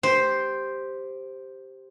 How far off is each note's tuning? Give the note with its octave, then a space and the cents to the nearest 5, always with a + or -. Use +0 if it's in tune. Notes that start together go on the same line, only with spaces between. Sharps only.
G4 +0 C5 +0